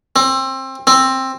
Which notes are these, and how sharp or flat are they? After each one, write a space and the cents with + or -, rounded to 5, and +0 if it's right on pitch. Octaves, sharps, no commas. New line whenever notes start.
C4 +25
C4 +15